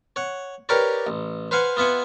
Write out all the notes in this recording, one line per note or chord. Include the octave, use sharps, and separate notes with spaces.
C#5 F#5
G4 A#4 B4 C#5 D5
A1
B4 C5 F5 F#5 G#5
B3 F4 E5 F#5 G#5